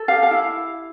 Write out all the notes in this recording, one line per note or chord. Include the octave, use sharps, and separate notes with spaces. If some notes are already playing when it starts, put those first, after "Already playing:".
Already playing: A4
G4 F5
F5
E4